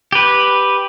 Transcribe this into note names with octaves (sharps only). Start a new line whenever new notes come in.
G4 B4